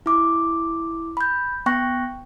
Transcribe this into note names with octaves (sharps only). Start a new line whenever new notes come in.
E4 D6
B5 G6
B3 G5 C#6 F#6 A#6